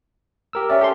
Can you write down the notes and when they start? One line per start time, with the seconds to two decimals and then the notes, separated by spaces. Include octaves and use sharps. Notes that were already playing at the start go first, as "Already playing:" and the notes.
0.53 G4 A#4 E6
0.70 C#4 D5 E5
0.81 G4 A4 C6